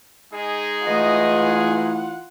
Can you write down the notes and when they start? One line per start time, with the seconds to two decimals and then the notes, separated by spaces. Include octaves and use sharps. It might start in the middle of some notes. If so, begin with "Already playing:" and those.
0.32 G#3 D#4 G#4
0.87 E3 A3 F4 D#5 F#5